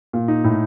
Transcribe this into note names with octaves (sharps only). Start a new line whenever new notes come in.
A#2
D#4
A2